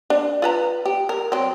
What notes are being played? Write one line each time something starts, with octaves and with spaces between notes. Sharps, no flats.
D4
F4 B4 A#5
G4
A#4
F#3 C4